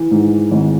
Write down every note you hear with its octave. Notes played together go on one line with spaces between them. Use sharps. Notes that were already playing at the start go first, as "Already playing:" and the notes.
Already playing: E3
G#2
G#1